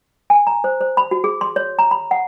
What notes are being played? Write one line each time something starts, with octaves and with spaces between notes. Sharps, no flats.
G#5
A#5
C5
C5
B5
F#4
G#4
C6
C#5
A#5
B5
F#5